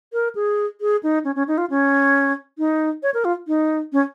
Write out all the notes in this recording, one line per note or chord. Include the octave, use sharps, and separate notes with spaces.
A#4
G#4
G#4
D#4
C#4
C#4
D#4
F4
C#4
D#4
C#5
A#4
F4
D#4
C#4